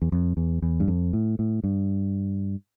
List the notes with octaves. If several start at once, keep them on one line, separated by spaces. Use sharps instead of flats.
E2
F2
E2
E2
G2
F2
A2
A2
G2